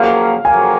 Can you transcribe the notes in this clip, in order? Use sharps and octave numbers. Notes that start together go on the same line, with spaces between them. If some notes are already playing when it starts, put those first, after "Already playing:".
Already playing: F2 C#3 F#3 A#3 F5
F2 C#3 F#3 A#3 G#5